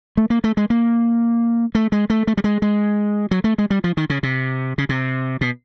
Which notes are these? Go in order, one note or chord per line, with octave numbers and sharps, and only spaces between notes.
A3
A#3
A3
G#3
A#3
A3
G#3
A3
A3
G3
G#3
G#3
F#3
A3
G#3
G3
F3
D#3
C#3
C3
C#3
C3
B2